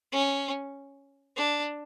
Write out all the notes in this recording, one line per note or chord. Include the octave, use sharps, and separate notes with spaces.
C#4
D4